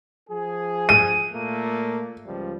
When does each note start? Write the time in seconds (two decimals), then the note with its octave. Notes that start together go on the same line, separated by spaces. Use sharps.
0.28 F3 G#4
0.89 D#7
1.32 A#2 A3 A#3
2.25 C#2 F3 G3